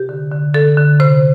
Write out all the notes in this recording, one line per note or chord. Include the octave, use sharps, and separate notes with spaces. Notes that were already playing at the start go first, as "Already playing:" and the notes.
Already playing: C3 G4
D3
D3
D3 A4
D3
C3 C5